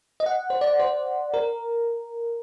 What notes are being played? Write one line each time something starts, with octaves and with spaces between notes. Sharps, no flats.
D#5
F#5
C5
D5
C5
A#4